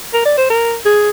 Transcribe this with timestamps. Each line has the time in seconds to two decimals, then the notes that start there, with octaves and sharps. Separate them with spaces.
0.14 A#4
0.25 D5
0.38 C5
0.50 A#4
0.85 G#4